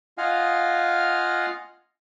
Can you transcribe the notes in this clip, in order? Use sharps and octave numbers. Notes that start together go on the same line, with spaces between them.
F4 D#5 F5 F#5 G#5 F6